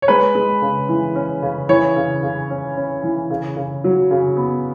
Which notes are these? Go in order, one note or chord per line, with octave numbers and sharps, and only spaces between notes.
C#5
G#3 B4
G#3
C#3
E3
C#4
C#3
E3 C#5
C#3
C#3
C#4
C#4
E3
C#3
C#3
F#3
C#3
B3